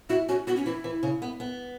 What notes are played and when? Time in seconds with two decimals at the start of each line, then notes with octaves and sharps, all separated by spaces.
0.09 E4 F#4
0.28 C#4 F#4
0.47 B3 F#4
0.56 C#4
0.65 E3 E4
0.84 E3
1.03 C#3
1.22 B3
1.40 B3